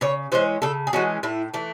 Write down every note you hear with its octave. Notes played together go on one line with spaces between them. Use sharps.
C#3 C#5
E3 G#3 C#4 C5
C#3 A4
G#4
E3 G#3 C#4 F#4
A2 E4
E3 A3